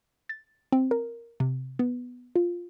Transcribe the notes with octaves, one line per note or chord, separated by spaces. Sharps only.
A6
C4
A#4
C3
B3
F4